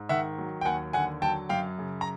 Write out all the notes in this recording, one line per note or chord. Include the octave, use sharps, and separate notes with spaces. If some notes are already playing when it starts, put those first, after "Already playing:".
Already playing: G#2
D#3 E5 F#5
F#3
G5
D#2 F#5 G#5
D3 F#5 G#5
F#3 G5 A5
F#2 F5 G5
C#3
A#5